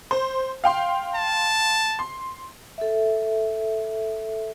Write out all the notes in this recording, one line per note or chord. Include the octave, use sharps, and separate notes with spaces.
C5
F5 G5 C6
A5
C6
A4 E5